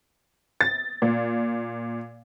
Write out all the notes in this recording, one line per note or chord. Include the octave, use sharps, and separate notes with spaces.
A6
A#2